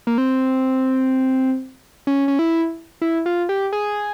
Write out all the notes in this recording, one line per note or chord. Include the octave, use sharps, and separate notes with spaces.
A#3
C4
C#4
C#4
E4
E4
F4
G4
G#4